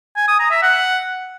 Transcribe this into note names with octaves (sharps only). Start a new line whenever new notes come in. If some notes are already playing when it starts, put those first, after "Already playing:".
G#5
D#6
A#5
E5
F#5